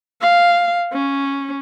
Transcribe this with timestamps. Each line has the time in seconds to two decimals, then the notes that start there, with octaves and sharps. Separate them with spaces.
0.22 F5
0.93 C#4